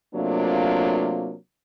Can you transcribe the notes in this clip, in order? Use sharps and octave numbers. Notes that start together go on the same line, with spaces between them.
C3 F#3 A3 A#3 D4 F4